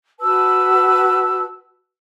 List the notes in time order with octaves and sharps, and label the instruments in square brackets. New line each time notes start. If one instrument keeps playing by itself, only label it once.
[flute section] F#4 B4 A5 E6